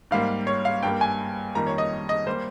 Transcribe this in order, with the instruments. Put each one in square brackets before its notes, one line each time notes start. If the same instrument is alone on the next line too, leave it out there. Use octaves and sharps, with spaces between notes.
[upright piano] G#2 G3 A#3 F5
C#5
F5
G2 G3 A#3 G5
G#5
F2 D#3 G3 A#3 A#5
C#5
D#5
D#5
G3 A#3 C5